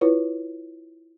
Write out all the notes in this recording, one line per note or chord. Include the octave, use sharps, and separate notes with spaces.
E4 F4 B4 C#5